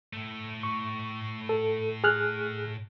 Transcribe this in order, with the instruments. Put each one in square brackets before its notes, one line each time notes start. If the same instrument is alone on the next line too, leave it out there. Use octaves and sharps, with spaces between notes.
[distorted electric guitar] A2 A3
[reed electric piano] C#6
A4
G#4 F6 F#6